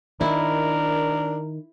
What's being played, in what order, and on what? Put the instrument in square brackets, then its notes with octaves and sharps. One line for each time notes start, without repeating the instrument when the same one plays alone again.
[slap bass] D#3 [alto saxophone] D4 [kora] E4 [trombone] A#4